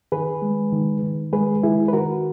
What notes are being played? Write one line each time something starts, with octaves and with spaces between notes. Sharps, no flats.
D#3 G#4 B4
G#3
D#3
D#3
G#3 G#4 B4
D#3 E4 G#4
B4
D#3 F#4 A#4